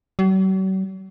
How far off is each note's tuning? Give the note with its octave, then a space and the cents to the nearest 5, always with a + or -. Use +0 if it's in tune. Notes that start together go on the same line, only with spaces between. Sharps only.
F#3 +45